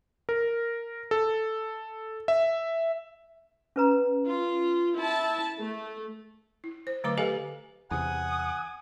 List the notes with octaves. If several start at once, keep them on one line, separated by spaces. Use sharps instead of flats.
A#4
A4
E5
C#4 B4 A#5
F4
E4 E5 A5
A3
E4
C5
D3 F#3 A3 B4 A#5 D6
G4 A4 B4 D#5 F5 G#5
E2 C3 F#5 G#5 D#6